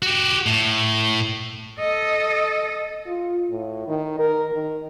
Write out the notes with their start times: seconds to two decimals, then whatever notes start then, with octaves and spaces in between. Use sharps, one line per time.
0.02 F#4 G4
0.46 A2
1.79 A4 D#5
3.07 F4
3.50 A2
3.88 D#3
4.19 A#4
4.53 D#3